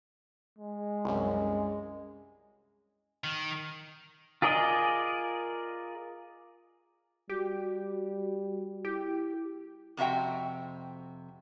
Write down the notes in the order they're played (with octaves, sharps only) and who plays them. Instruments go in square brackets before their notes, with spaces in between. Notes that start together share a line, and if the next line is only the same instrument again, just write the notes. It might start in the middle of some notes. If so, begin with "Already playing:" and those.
[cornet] G#3
[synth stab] C2 F#2
[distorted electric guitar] D#3
[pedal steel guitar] F4 G#4 A#4 D5 D#5
[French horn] G3 [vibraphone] F#4 [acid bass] G4
[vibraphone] E4 [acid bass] G4
[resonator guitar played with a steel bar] F2 C3 F#4 E5 G5